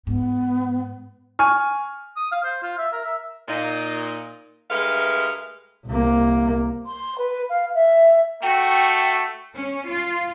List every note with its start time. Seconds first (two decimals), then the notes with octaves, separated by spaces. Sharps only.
0.07 G#2 B3
1.39 G#5 C#6 F6
2.16 D#6
2.32 F5
2.44 C5
2.63 F4
2.78 E5
2.92 A#4
3.04 E5
3.48 A#2 D#4
4.69 G2 G#3 A3 A#4 B4 F5
5.87 C2 A#3
6.86 C6
7.18 B4
7.49 F5
7.75 E5
8.42 A3 F#4 G5
9.56 C#4
9.89 F4